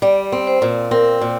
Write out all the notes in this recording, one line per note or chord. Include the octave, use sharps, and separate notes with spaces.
G3 D5
C4
C5
A#2
C4 A#4
A#2